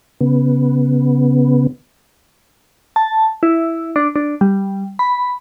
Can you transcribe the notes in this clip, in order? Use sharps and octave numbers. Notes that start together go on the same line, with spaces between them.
C#3 B3
A5
E4
D4
D4
G3
B5